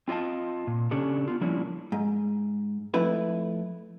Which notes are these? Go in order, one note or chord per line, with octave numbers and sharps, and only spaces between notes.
C4 F4 D#5 F5 A5
A#2
C#3 C#4 D4 G4 A4
B3 F4
F3 G3 A#3 C#4 D4 E4
G#2
F2 A3 E4 B4